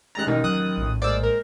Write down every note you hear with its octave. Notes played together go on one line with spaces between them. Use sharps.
G#1 G#3 A#5 F#6 A6
A1 B2 D#3 D#4 A#4
F#3 D#6 F#6
A#1 A2
G#3 A#3 C5 D5 E6
A#4